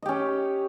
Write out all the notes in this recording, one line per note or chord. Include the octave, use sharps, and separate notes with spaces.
C#4 G4 D#5